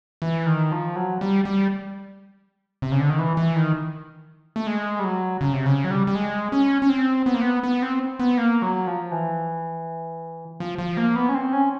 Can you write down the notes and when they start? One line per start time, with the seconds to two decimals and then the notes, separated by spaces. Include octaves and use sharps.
0.22 E3
0.46 D#3
0.72 F3
0.96 F#3
1.21 G3
1.45 G3
2.82 C3
2.91 C#3
3.00 D3
3.09 D#3
3.19 E3
3.37 E3
3.56 D#3
4.56 A3
4.67 G#3
4.99 G3
5.04 F#3
5.41 C#3
5.53 C3
5.66 C#3
5.84 F#3
5.91 G3
6.07 G3
6.15 G#3
6.52 C#4
6.82 C#4
6.89 C4
7.26 B3
7.34 A#3
7.41 B3
7.64 B3
7.82 C4
8.20 B3
8.38 A#3
8.62 F#3
8.87 F3
9.12 E3
10.60 F3
10.79 F3
10.97 A#3
11.16 B3
11.29 C#4
11.35 C4
11.53 C#4